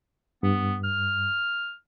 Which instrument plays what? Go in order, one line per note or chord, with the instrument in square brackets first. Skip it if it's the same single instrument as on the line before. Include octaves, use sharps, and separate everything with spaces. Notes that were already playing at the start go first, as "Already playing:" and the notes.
[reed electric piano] G2 [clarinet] B3
[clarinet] F6